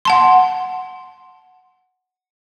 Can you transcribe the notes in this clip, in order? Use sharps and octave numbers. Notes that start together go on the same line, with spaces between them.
F#5 A5 C6